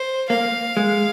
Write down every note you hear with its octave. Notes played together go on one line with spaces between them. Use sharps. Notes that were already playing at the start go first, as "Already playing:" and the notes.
Already playing: C5
A#3 F5
G#3